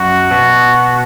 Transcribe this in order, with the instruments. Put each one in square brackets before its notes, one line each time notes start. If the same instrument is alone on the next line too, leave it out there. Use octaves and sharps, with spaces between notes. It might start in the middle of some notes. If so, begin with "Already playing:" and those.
Already playing: [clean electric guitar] F#2 F#3 [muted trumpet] F#4
[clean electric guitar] B2 B3